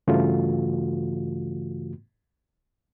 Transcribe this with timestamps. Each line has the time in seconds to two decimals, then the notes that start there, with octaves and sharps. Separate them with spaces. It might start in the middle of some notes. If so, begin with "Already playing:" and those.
0.07 G2 C#3 E3 A3 F4 F#4